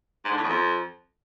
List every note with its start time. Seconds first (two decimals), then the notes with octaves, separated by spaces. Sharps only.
0.25 G#2
0.31 D3
0.37 A2
0.43 E2
0.49 F2